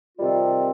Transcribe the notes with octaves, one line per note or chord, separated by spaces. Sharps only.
C3 D#3 G3 C4 F4